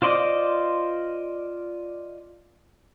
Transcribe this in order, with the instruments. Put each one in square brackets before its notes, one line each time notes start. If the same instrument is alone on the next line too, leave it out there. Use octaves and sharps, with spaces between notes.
[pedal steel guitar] F4 C5 D5 D#5 D6